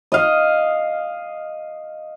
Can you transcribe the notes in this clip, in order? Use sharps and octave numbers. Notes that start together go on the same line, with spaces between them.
D#5 F5